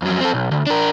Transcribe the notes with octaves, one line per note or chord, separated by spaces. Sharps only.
F2 F#3
C4 A4
B1
D2
D4 A#4